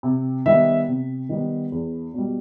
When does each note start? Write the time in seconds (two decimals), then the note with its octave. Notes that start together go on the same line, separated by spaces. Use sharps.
0.03 C3
0.46 D#3 G3 B3 E5
0.88 C3
1.29 D#3 G3 B3
1.72 E2
2.14 B2 G3